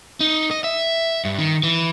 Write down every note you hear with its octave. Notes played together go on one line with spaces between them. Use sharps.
D#4
D#5
E5
G2
D#3
E3